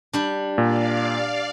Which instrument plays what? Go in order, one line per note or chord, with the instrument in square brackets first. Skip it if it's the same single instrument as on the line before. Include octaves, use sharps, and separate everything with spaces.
[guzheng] G3 D4
[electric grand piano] A#2 [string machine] D5 F5